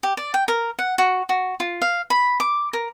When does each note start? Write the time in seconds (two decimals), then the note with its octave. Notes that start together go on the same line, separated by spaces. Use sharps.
0.03 G4
0.17 D5
0.34 G5
0.48 A#4
0.79 F#5
0.98 F#4
1.29 F#4
1.60 F4
1.82 F5
2.10 B5
2.40 D6
2.73 A#4